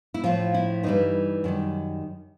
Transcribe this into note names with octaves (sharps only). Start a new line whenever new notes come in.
E4
A2 F3 F4
E4
G2 E3 G3 D#4
F#2 D#3 G3